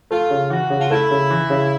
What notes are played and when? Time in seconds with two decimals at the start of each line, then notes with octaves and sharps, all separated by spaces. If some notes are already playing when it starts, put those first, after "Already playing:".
0.10 A3 F4
0.30 C#3
0.50 E3 F#4
0.70 C#3
0.79 F4
0.90 A3 E4
1.11 C#3
1.31 E3
1.50 C#3